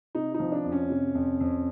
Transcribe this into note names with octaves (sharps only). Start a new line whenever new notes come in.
C3 D#4
D#4
F3
D4
F2
C#4
C3
F2
F2